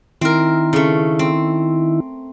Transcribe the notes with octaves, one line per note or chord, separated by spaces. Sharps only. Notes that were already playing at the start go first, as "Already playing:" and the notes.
D#3 C4 E4 A#4
C#3 A3
C4